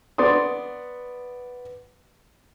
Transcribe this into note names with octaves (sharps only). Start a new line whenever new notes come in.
B3 D5 C6 D#6